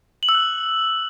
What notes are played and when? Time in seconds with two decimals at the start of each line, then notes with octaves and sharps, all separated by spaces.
0.23 F#7
0.29 E6
0.35 F#6